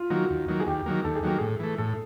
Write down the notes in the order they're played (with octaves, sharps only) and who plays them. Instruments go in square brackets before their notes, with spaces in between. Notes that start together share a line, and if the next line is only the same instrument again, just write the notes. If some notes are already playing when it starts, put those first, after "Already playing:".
Already playing: [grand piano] F4
[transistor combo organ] D#3 F#3 A#3 [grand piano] F#4
[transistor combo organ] D#2
D#3 F#3 A#3
[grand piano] G#4
[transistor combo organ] D#2 [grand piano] G4
[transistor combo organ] D#3 F#3 A#3
[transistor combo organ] D#2 [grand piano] A4
[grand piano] G#4
[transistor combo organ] D#3 F#3 A#3 [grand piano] G4
[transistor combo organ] A2 [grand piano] G#4
[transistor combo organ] E3 A3
[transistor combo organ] A2 [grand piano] A4